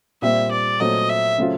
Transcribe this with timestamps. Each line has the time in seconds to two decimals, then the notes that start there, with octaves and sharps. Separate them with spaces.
0.22 A#2 G3 C4 E5
0.51 D5
0.80 A#2 F#3 A3 C4 D#5
1.09 E5
1.38 C#3 F#3 A3 C4 F4